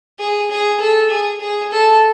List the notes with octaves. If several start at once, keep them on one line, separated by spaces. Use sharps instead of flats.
G#4
G#4
A4
G#4
G#4
A4